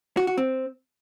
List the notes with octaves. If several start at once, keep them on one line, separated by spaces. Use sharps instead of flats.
F#4
F#4
C4